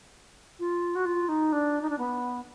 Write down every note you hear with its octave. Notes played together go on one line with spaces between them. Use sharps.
F4
F#4
F4
D#4
D4
D#4
D4
B3